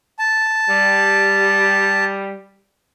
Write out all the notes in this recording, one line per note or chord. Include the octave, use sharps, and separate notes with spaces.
A5
G3